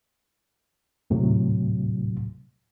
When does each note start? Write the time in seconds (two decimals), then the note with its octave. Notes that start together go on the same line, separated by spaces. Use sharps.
1.10 D#2 A2 C3 F#3